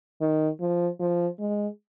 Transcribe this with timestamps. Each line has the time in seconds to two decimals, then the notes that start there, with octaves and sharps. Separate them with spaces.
0.21 D#3
0.60 F3
1.00 F3
1.40 G#3